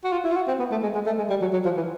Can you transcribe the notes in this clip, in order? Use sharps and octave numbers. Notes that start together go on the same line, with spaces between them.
F#4
F4
E4
F4
F#4
C4
B3
A3
G#3
G#3
A3
G#3
G3
F#3
F#3
F3
E3